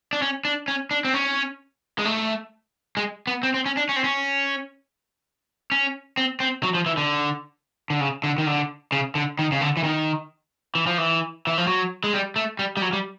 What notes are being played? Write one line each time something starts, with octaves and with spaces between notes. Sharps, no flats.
D4
C#4
D4
C#4
D4
C4
C#4
G#3
A3
G#3
B3
C4
C4
C#4
D4
C#4
C4
C#4
C#4
C4
C4
F#3
F3
E3
D3
D3
C#3
D3
D#3
D3
C#3
D3
D#3
C#3
D3
E3
D#3
E3
F3
E3
E3
F3
F#3
G#3
G3
A3
G3
G3
F#3
G3